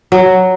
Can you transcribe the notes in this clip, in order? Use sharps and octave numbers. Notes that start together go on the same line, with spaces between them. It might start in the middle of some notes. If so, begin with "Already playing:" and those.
F#3